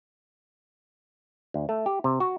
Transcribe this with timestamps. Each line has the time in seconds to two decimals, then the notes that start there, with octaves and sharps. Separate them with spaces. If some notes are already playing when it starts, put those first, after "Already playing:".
1.54 D2
1.69 A3
1.86 G4
2.04 C3
2.20 F#4